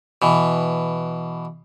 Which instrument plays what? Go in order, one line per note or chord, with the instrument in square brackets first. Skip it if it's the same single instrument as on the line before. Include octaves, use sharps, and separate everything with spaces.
[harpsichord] B2 E3